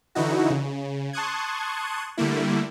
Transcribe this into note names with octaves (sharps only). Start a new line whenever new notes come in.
D3 E3 D#4 E4 F#4
C#3
A5 C6 C#6 D#6 F#6 G#6
D3 G3 A3 A#3 E4